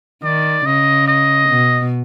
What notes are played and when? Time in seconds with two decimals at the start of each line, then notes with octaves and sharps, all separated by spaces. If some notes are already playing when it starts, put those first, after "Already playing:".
0.24 D#3 D5
0.66 C#3 D#5
1.08 D#5
1.50 B2